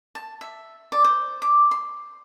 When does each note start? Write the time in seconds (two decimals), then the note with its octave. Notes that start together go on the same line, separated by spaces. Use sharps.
0.15 A5
0.41 E5
0.92 D5
1.04 C5
1.42 D6
1.71 C6